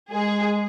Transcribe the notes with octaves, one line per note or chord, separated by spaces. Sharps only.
G#3 G#4